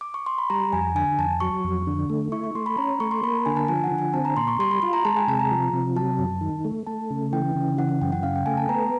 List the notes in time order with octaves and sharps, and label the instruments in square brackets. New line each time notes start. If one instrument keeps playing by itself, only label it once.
[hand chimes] D6
C#6
C6
B5
[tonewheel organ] G3 [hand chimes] A#5
[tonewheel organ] F2 [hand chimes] G#5
[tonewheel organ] D3 [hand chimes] G#5
[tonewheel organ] F2 [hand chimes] A5
[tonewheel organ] F#3 [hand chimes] C#6
[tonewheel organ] F2
D3
A3
[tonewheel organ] E4 [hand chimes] C#6
[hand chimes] C#6
[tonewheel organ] A3 [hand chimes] C6
[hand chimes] B5
[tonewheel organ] C#4 [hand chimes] A#5
[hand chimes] B5
[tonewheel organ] A3 [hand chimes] C#6
[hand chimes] C6
[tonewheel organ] A#3 [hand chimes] B5
[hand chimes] A#5
[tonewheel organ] D3 [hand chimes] G#5
[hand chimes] A5
[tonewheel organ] F3 [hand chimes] G#5
[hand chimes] F#5
[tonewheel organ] D3
[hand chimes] G#5
[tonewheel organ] C4 [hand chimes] A5
[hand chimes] A#5
[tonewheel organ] A#2 [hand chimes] C6
[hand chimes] C#6
[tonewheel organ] G3 [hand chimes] C6
[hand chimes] B5
[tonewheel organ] F4 [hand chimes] C6
[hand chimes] A#5
[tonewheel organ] G#3 [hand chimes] A5
[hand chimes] G#5
[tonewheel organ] C3 [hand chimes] A5
[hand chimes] A#5
[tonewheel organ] F3
C3
[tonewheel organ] F#3 [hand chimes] A5
[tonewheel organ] F#2
D#3
A3
[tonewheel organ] A3 [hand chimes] A5
[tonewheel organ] C#3
[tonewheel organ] E3 [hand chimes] G5
[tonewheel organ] C#3
[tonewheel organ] E3 [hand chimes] F#5
[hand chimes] F#5
[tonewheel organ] F#2 [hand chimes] G5
[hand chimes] F#5
[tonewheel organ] C#3 [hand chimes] F5
[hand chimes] G5
[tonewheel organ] A3 [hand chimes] G#5
[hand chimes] A5
[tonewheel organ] B3 [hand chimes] A#5